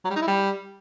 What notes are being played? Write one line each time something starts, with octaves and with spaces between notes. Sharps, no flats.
F#3
G3
D#4
E4
G3